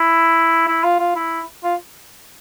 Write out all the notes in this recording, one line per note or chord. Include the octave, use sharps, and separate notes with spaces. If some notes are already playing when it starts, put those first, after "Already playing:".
Already playing: E4
E4
F4
F4
E4
F4